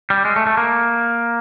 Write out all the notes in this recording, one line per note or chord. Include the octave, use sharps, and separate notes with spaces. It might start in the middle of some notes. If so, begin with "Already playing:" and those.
G3
G#3
A3
A3
A#3